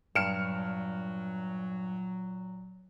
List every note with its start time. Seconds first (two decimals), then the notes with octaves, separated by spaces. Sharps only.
0.15 G2 A#2 F#3 F6 C#7 E7